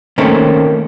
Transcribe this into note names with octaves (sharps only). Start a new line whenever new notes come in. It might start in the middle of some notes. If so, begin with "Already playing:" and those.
D#3 A3 A#3 C4 C#4